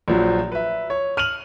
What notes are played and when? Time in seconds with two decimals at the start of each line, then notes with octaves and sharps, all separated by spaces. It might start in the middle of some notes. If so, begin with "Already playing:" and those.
0.08 A#1 F3 F#3
0.52 B4 E5
0.90 C#5
1.17 F6 D#7 F7 F#7